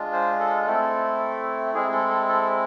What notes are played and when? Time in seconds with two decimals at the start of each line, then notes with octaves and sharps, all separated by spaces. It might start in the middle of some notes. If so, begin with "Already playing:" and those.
Already playing: G#3 D4 F4
0.13 C5
0.40 A4
0.66 A3 C4 E4 A4
1.75 G#3 C4 E4 G#4
1.92 A4
2.10 A4
2.29 A4